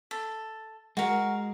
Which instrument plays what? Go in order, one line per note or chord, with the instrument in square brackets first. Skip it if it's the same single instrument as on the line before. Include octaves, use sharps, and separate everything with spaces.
[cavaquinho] A4
[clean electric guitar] G#3 [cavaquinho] F#4 A#4